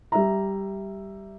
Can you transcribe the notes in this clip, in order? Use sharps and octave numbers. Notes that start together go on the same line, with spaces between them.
G3 E5 A#5